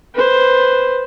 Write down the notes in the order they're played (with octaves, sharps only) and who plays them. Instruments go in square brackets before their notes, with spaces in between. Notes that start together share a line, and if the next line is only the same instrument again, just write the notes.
[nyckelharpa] B4 C5